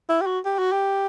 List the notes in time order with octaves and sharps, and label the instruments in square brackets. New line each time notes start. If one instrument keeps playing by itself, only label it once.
[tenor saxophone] E4
G4
F#4
G4
F#4
G4